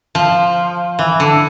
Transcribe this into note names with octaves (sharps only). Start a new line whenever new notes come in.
F3
E3
D3